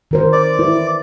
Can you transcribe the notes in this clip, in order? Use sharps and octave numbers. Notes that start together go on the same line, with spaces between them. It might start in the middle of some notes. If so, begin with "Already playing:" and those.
D#3 A#4 C5
D5
E4 B4